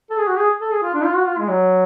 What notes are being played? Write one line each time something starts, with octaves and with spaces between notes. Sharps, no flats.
A4
G#4
F#4
G#4
A4
G#4
F4
D4
F4
F#4
F4
G#3
F#3